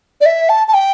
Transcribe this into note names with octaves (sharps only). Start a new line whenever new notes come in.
D5
E5
A5
A5
G5